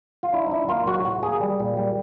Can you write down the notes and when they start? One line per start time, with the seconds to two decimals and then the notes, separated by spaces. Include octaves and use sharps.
0.23 F4
0.33 D4 E4
0.47 D#4
0.51 D4 E4
0.69 A#3 F4
0.87 F#3 F#4
1.05 A2 F#4
1.23 A#3 G#4
1.41 G3
1.60 A#2
1.77 G3